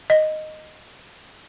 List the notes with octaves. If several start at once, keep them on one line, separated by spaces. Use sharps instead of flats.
D#5